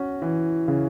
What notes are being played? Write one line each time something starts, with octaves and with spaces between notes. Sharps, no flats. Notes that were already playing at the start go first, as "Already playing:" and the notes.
Already playing: C#4 F#4
E3
C#3